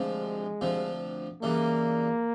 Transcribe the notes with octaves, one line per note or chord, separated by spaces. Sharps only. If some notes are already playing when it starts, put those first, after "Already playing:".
Already playing: D2 C3 F3 G#3
D2 C3 F3
C#3 E3 G3 A#3